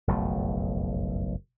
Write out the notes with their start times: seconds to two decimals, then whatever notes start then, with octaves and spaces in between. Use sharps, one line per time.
0.07 F#1 B1 F2 A3